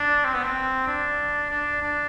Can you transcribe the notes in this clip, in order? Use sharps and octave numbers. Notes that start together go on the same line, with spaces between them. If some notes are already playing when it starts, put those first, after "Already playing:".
Already playing: D4
C4
B3
C4
D4
D4
D4